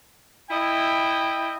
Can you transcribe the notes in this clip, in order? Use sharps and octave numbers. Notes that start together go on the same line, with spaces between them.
E4 D#5 G5